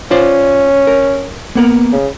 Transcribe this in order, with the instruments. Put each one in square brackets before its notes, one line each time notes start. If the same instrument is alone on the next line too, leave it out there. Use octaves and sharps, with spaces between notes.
[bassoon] C#4 [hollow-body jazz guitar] F4 C5 D5
[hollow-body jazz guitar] A#4
A#3 B3 A#4
[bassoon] C#3